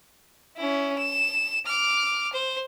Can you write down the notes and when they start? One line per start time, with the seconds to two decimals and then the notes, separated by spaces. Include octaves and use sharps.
0.57 C#4 E4
0.98 E7
1.66 D6 F6
2.33 C5